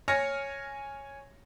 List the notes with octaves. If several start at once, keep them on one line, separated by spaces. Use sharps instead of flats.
C#5 G#5 F6 A#6 C#7